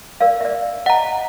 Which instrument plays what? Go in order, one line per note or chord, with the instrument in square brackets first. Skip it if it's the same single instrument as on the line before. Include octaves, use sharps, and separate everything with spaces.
[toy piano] A#4 D5 F5
D5 E5
[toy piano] D#5 [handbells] F#5 A#5